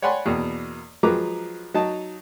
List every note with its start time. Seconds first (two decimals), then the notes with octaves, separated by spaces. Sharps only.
0.02 C#5 D5 F#5 G#5 B5 C6
0.26 E2 B2 A#3
1.03 F3 F#3 G#3 B4 A#5 D6
1.74 F#3 D#4 A5